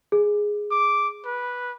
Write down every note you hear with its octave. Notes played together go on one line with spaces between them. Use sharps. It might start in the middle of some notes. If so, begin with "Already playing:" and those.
G#4
D6
B4